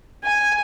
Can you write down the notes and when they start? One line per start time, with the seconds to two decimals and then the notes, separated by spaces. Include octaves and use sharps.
0.24 G#5